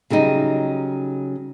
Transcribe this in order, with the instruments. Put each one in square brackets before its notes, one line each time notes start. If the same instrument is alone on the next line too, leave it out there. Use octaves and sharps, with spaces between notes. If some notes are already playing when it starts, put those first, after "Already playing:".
[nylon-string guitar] C#3 F#3 G3 D#4